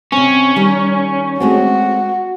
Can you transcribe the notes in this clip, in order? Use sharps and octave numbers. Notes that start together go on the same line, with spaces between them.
C3 C4 C#4
D#3 G3
G#3 A3 C4 F#4